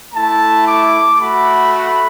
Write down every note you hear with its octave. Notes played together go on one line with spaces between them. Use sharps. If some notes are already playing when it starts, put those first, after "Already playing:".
A3 E4 A5
D6
A3 F#4 B5
B5